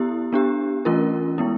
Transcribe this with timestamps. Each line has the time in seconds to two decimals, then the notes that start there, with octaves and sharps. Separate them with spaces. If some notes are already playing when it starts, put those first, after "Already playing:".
Already playing: B3 E4 G4
0.33 B3 D4 G4
0.85 E3 A3 C#4 F4 A#4
1.38 G#3 B3 E4